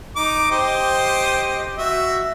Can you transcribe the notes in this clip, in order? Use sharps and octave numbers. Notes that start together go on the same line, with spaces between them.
D#4 D6
G4 C5 D#5
F#4 E5